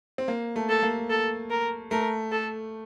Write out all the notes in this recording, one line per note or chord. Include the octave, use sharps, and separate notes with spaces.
C4
A#3
A3
A4
A#3
A4
A#4
A3 A#4
A4